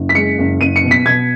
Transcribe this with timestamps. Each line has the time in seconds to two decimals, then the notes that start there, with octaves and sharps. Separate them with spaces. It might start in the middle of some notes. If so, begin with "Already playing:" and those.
Already playing: F#1
0.09 B6
0.15 G#3 C#7
0.38 F#1
0.61 F#1 D#7
0.76 C#7
0.83 B2
0.91 B6
1.05 B2 G#6